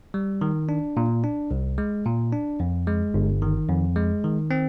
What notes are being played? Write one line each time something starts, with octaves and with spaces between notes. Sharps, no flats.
G3
D#3
D4
A#2
D4
C2
G#3
A#2
D4
F2
G#3
G1
D#3
F2
G#3
D#3
C4